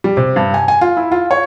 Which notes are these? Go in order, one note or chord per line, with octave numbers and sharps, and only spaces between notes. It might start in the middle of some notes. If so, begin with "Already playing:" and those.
G3
C3
G2
G#5
G#5
F4
E4
F4
C#5